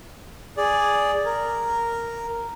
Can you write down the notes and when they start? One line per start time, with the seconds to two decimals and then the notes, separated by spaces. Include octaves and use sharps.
0.57 G#4 D5
1.25 A#4